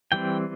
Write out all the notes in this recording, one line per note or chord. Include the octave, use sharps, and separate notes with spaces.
E3 G3 C4 G5